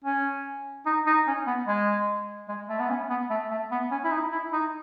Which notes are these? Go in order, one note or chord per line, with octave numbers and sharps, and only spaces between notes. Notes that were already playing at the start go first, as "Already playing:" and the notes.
C#4
D#4
D#4
C#4
B3
G#3
G#3
A3
B3
C#4
B3
A3
A3
B3
C#4
E4
D#4
E4
D#4